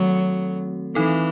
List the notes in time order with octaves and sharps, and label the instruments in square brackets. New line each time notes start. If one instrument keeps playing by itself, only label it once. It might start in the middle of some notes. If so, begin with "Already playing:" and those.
Already playing: [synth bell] D#3 A3 C4 F#4 A4 [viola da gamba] F#3
[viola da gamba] E3 [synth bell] C4 D#4 A4